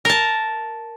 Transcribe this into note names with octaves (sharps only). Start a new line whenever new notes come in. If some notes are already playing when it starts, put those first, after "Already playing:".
A#4 A5